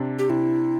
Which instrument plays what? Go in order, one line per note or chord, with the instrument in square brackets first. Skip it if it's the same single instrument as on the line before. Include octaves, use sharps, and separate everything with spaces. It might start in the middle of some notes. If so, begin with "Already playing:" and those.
Already playing: [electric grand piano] C3 D4
[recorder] G4
[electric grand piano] C3 [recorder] E4